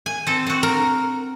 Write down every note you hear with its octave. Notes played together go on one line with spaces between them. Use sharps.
G#5
C4 A4
C4 F#4
A#4